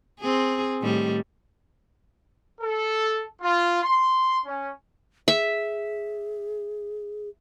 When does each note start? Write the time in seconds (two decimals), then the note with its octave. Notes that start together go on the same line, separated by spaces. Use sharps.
0.20 C4 G#4
0.82 A2 D#3 G3
2.60 A4
3.42 F4
3.81 C6
4.45 C#4
5.28 G#4 E5